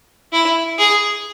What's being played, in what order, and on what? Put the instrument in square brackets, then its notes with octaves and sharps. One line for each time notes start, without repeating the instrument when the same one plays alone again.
[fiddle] E4
G#4